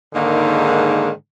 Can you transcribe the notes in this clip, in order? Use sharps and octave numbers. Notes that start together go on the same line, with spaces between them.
G#2 D3 D#3 G#3 A#3